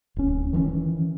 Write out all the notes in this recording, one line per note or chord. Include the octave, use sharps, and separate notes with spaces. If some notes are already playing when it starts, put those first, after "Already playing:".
D1 C#4
D#3 E3 G3 C#4